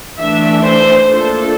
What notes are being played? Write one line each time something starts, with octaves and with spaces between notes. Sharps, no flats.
E3 A3 D4 E5
C5
F3 A#3 D4 A4